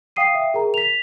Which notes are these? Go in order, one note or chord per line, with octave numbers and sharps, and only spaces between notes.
F5 G5 D#6 C7 D#7
E5 G5
G#4 A#4 A#5
B6 F7